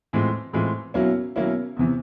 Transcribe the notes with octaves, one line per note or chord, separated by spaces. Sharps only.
A2 E3 G#3 C4 F4
A2 E3 G#3 C4 F4
B2 F#3 A#3 C#4 E4
B2 F#3 A#3 C#4 E4
E2 C3 E3